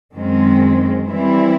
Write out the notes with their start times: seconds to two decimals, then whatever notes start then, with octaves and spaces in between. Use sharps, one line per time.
0.15 F#2 D#3 G#3 C4
1.08 E3 G3 C4 E4